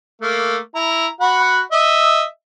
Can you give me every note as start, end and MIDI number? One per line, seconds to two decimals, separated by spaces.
0.22 0.57 57
0.22 0.57 58
0.75 1.07 64
0.75 1.07 82
1.21 1.60 66
1.21 1.60 78
1.21 1.60 83
1.72 2.23 75
1.72 2.23 76